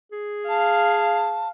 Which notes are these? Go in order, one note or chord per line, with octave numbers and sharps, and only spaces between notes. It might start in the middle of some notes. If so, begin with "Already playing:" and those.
G#4
F5 A5